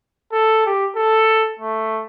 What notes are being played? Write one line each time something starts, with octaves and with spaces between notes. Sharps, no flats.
A4
G4
A4
A3